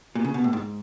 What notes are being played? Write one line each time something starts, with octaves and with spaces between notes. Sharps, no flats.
A#2
C#3
B2
A2
G#2